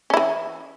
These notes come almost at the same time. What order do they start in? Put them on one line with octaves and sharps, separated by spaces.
C#4 E4 E3